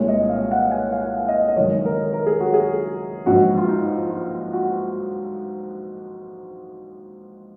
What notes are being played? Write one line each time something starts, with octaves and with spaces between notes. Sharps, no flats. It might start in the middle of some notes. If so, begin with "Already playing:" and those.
Already playing: C2 A#2 G#3 C#5
D#5
F5
F#5
G#5
F5
F#5
D#5
D#5
F#1 F#2 D#3 G#3 C#5
A#4
A#4
G#4
F#4
G#4
A#1 G#2 F#3 F#4
F4
D#4
F4
F#4